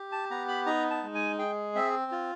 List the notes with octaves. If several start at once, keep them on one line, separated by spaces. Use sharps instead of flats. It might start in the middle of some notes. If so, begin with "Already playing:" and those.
Already playing: G4
A5
B3 A#5
B5
D#4 A#5
A5
G#3
G#5
G#4 G5
C4 E5
F4